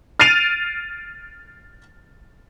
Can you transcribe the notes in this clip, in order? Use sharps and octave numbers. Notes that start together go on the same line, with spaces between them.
F6 A6 C7 D7 D#7 F7